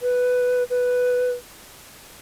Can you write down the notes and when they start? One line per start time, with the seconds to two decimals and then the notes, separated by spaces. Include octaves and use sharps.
0.02 B4
0.70 B4